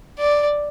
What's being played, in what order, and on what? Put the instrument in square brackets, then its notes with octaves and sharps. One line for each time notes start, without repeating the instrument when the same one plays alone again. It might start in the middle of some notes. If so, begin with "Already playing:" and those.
[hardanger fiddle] D5